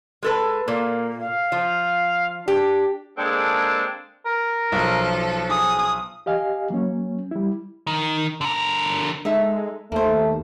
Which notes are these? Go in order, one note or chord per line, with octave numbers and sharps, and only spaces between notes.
G#3 A4 B4
A#2 A#3
F5
F3
D4 G4
G#3 A#3 C4 D4 G#4 A4
A#4
B1 F3 A4
G#4 D#6
G4 D#5 F5 G#5
F#3 A#3 C#4
G3 E4
D#3
D3 A#4
G#3 D#4 A4 E5
D#2 A3 A#3 C5